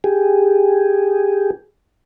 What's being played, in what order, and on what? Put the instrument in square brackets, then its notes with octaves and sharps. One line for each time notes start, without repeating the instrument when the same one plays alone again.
[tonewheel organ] G4 G#4